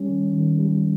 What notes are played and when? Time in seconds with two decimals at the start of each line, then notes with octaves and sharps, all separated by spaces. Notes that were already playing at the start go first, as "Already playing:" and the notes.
Already playing: G3 C#4
0.09 D#3
0.33 D#3
0.59 G3